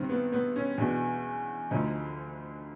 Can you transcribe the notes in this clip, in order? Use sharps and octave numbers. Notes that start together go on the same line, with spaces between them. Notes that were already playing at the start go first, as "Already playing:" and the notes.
Already playing: G2 D#3 C4
B3
B3
C#4
E2 B2 D4
D2 D3 F3 D#4